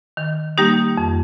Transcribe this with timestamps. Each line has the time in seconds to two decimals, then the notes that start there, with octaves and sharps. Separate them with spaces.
0.17 D#3
0.58 G3 A#3 D#4 G4
0.98 F2